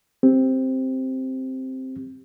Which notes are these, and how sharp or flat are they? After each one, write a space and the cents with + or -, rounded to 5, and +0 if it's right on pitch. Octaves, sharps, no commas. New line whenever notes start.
C4 +0 G4 +0